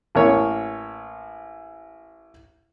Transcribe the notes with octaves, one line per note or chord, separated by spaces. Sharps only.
A1 A#3 C#5